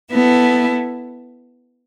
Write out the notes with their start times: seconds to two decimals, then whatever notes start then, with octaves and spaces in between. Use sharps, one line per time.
0.12 B3 E4 A4